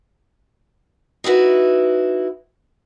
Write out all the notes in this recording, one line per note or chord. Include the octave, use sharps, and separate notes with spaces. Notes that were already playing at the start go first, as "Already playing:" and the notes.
D#4 E4 F#4 B4